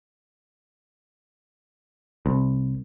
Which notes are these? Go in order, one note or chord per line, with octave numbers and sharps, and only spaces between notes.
C2